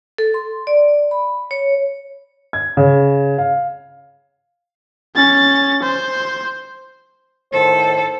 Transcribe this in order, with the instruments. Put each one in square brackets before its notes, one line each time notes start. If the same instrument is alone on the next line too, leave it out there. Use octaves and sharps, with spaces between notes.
[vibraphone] A4
C6
D5
B5
C#5
[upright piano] G#6
C#3
F5
[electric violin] C#4 A6
C5
[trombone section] A2 D#3 C5 [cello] A4